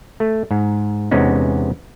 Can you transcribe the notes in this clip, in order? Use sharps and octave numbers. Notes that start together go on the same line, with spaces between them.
A3
G#2
E2 C3 G#3 B3 C#4 D#4